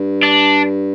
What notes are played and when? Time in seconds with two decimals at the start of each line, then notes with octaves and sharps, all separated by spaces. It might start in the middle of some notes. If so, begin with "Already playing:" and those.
Already playing: G2
0.23 D4